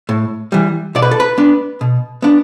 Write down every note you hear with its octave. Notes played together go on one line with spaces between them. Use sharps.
A2
E3 G3
B2 D5
B4
A4
B4
B3 D4
B2
B3 D4